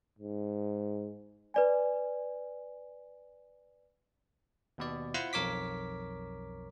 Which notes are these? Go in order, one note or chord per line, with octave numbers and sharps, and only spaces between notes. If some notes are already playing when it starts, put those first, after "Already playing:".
G#2
B4 D5 G#5
D#2 B2 D5
E4 F4 C5 F#5 C6
B1 F2 A#4 C#5 D6 B6